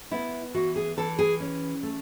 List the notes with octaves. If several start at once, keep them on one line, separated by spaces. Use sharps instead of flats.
B3 E4
E3 F#4
G#4
E3 A4
G#4
C#4
A3